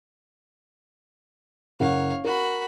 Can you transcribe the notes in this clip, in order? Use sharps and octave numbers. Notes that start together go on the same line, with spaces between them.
F#1 A#4 C#5 F5 F#5
F#4 A#4 B5